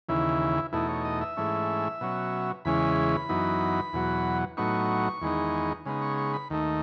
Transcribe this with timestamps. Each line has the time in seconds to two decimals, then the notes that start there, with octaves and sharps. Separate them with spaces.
0.09 D#2 C#3 E3 E4
0.73 E2 B2 A3 D#4 E4
0.89 C#5
1.05 D#5
1.21 E5
1.37 G#2 E3 A3 C#4
2.01 B2 F#3 C#4
2.65 E2 C#3 E3 G#3 C#4 B5
3.29 F#2 E3 B3 D#4
3.93 E2 B2 F#3
4.57 A2 F#3 B3 D#4 C#6
5.22 E2 D#3 G#3 B3 D#4
5.85 C#3 G#3 B3 D#4
6.02 C#6
6.18 C#6
6.34 B5
6.50 D#2 D#3 A3 D#4